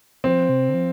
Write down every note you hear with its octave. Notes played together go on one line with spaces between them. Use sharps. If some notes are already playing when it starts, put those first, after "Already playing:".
F3 C4
C3
D3
F3